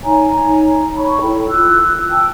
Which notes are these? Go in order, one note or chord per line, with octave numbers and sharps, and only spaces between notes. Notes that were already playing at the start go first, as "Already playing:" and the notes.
D#4 C#5 G#5 A#5
C#5 A5 B5 C#6
E4 A4 G5
F4 E6 F#6
G5 A5 E6